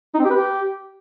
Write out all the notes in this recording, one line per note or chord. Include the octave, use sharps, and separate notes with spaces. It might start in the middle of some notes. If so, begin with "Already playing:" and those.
D#4
C4
G4
B4
G4